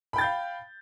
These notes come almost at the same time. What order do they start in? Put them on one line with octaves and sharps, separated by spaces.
B5 G5 A6 G6 F5